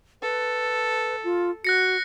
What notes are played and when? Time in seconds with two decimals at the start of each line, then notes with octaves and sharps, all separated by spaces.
0.22 A4 B4
1.24 F4
1.65 F#4 F#6 A#6 C#7